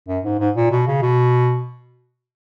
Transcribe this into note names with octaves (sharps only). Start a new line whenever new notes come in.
F#2
G#2
G#2
A#2
B2
C#3
B2